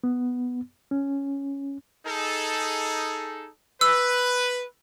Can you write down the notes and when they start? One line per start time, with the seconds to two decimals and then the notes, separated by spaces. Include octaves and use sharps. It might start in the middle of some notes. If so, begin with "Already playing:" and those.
0.04 B3
0.91 C#4
2.06 D#4 G#4 A4
3.81 B4 E6